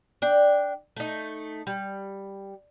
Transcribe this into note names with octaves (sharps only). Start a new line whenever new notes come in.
D4 G5
A3 D#4
G3